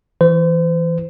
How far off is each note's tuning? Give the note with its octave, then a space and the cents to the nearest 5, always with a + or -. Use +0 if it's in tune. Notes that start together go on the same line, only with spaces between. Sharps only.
E3 +0 C5 -40